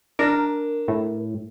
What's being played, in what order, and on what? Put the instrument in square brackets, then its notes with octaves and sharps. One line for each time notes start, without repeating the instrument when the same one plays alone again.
[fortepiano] D4 [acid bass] A#4
[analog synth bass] A2